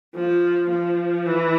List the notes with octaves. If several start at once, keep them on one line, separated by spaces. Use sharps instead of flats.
F3
F3
E3